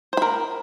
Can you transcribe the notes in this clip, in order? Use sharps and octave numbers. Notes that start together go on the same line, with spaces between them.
A#4 C5 B5